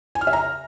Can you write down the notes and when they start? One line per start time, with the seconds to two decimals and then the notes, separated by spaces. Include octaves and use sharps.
0.15 G#5
0.21 F6
0.27 E5
0.33 A#5